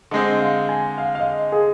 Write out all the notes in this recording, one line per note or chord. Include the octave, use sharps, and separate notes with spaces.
D3 G#3 C4 D#5
F5
G#5
F5
F5
D#5
G#4